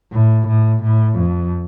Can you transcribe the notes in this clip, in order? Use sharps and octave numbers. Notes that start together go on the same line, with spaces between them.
A2
A2
A2
F2